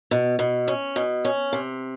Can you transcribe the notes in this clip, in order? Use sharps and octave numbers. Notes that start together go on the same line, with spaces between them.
B2
B2
C#4
B2
C#4
C3